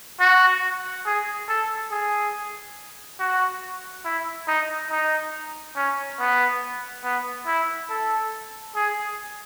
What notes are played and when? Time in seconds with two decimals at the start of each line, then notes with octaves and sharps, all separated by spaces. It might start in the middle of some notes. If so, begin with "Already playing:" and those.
0.20 F#4
1.06 G#4
1.48 A4
1.92 G#4
3.19 F#4
4.05 E4
4.48 D#4
4.90 D#4
5.76 C#4
6.19 B3
7.04 B3
7.47 E4
7.90 A4
8.76 G#4